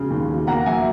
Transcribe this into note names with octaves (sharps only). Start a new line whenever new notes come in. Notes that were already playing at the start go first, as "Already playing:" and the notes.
Already playing: E1 C#3
D#2
E1
A#3 F#5 A#5
F#3 E5 G#5